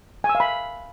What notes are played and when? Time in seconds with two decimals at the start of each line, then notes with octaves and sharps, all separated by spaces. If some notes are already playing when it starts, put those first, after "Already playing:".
0.24 G#5
0.29 E6
0.35 F5
0.40 B5